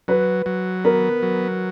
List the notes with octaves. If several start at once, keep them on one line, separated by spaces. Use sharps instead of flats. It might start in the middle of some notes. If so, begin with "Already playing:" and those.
F#3 B4
F#3
B3 A#4
F#3